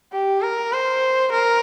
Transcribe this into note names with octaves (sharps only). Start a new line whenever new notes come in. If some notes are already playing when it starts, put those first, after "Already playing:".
G4
A#4
C5
A#4